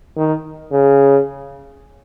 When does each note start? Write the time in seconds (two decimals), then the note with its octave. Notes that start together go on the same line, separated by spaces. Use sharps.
0.17 D#3
0.72 C#3